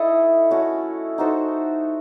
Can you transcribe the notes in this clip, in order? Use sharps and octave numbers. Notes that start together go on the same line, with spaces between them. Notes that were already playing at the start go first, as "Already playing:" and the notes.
Already playing: E4 A4 D#5
A3 C#4 F#4
D#4 F#4 A4 C5